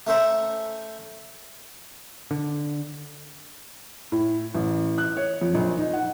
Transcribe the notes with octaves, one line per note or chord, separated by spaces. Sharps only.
A3 C#4 A4 C5 E5 A#5
D3
A2
A1
F#6
C#5
F2
A#1
D#4
F#5